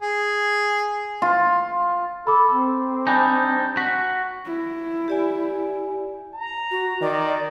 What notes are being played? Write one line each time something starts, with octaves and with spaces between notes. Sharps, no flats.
G#4
F4
A4 B5 D6
C4
G3 D4 D#4 G#5 B5 G6
F#4 B6
E4
G4 D5 G#5
A#5
F#4
D#3 D5